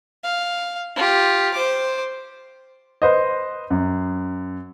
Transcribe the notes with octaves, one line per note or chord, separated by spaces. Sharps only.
F5
F4 G4
C5 D6
B4 C5 D#5
F#2